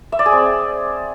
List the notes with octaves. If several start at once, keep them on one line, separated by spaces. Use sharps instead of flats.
E5
D5
G#4
C4